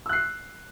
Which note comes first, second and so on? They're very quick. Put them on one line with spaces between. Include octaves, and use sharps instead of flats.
E6 F#6 C7